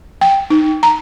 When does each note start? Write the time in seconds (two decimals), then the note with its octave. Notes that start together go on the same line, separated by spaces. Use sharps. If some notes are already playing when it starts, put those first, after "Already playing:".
0.21 G5
0.50 D#4
0.83 A#5